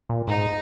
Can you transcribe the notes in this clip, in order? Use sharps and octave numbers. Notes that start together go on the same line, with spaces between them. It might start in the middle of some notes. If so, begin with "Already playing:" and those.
A#2
G#2 D#4